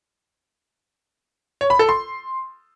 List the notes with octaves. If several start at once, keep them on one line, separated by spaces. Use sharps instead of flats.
C#5
B5
A4
C6